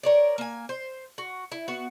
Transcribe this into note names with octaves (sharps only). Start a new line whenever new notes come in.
A#4 C#5 D5
A#3 G#5
C5
F#4
E4
B3 F#4 F#5